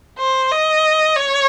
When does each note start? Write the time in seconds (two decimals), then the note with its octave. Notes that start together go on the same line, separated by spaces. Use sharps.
0.18 C5
0.51 D#5
1.17 C#5